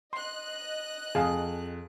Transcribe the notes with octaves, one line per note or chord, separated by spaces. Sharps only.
D#5 C6 F#6
F2 G#4 F5